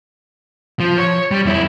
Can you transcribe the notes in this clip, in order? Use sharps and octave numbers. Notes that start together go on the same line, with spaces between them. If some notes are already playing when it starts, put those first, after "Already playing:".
F3
C#5
G3
F2 E4